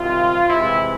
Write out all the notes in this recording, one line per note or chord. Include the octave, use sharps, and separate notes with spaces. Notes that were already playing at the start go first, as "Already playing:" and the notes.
Already playing: C3 D#3 G3 F4
C3 E3 G#3 E4